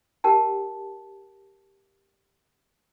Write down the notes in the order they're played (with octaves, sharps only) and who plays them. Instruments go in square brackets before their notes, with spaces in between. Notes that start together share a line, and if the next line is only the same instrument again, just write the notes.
[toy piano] G4 A#4 G5 A5